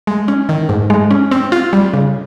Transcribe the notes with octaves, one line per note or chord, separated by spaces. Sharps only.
G#3
C#4
D#3
G#2
G#3
C#4
C4
F4
G3
C#3